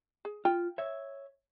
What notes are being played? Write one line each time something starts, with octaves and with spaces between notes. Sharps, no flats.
G#4
F4 G5
C#5 E5